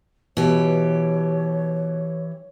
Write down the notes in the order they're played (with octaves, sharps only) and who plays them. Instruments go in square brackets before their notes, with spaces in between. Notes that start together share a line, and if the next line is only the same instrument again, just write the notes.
[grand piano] B2 [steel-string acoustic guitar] E3 G4 [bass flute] C#5